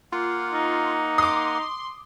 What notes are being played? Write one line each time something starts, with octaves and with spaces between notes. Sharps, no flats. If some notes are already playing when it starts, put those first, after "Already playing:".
A#3 F4 F#5
D#4
C6 D6 D#6